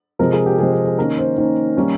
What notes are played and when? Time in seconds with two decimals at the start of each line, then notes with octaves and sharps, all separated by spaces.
0.19 C3 F3 G#3 A#4
0.33 G#4
0.46 G4
0.58 C3 F3 G#3 G#4
0.72 G4
0.85 G#4
0.98 D#3 A#3 C#4 A#4
1.18 C5
1.38 D#3 A#3 C#4
1.77 D#3 G3 A#3 C#4